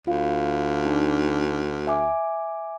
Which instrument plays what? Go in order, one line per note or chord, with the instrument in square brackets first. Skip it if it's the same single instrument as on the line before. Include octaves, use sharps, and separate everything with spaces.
[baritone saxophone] D2 [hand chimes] F4 F5
[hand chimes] D4 D#4
E5 G#5 D6